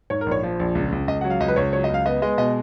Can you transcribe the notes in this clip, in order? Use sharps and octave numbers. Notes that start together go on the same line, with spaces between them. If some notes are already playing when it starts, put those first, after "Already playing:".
G#2 C#5
A#4
A#1
C#5
F3
A#1
C#2
C#2
C#2 D#5
F#3 F#5
F5
C#2 D#5
B4
C#2 C#5
F#3 C#5
D#5
C#2
F5
B3 D#5
G#3 D#5
B2 D#5